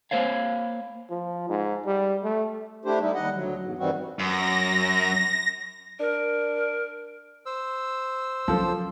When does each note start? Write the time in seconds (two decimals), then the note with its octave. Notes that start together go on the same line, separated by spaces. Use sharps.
0.11 A#3 C5 C#5 F5
1.10 F3
1.49 G#2
1.86 G3
2.23 A3
2.85 A3 D4 E4 G4 C5
3.00 G3 D#4 E4
3.14 D#2 G3 D#5 F#5
3.34 D2 F#3
3.62 E2 G#2
3.79 G2 D#3 E3 G3 C4 F#4
4.19 F#2 A#6
6.00 D4 A#4
7.46 C5 E6
8.48 F3 F#3 C#4 A4